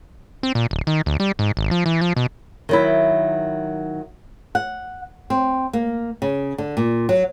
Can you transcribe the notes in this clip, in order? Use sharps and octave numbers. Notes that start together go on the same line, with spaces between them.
C4
A#2
D1
D#3
D2
G3
G#2
G#1
F3
E3
F3
B2
D#3 F#3 E4
F#5
C4
A#3
C#3
D3
A#2
F#3